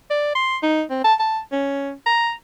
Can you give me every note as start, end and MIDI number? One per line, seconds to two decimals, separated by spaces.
0.10 0.32 74
0.35 0.57 84
0.63 0.83 63
0.90 0.99 60
1.04 1.14 81
1.19 1.40 81
1.52 1.92 61
2.06 2.31 82